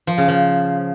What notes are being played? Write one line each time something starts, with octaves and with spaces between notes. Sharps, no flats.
F3
C#3
F3